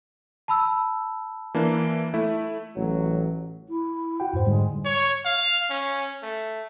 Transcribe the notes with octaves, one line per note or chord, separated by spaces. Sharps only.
A5 B5 E6
E3 A#3 D4
A3 E4
A1 F#3
E4
F#4 F#5 G5
F2 G#2 C5
G#2 D3 G3 G#3
C#5
F5
C#4
A3